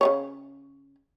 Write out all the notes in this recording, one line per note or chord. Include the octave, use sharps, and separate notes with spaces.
C#3 G3 C#5